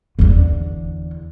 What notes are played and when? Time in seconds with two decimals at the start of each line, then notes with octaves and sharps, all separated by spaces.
0.19 E2 D3